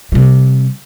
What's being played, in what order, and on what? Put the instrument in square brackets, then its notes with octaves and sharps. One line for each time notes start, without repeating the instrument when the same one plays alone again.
[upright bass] C3 G3